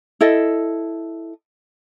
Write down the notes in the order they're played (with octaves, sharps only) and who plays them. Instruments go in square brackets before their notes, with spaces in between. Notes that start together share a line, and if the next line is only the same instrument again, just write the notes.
[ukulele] E4 A4 D#5